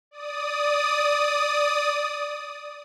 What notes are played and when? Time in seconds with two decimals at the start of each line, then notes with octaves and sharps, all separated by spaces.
0.11 D5 D#6